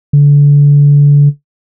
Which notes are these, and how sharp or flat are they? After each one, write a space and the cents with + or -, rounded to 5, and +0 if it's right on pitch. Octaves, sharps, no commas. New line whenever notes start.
D3 -30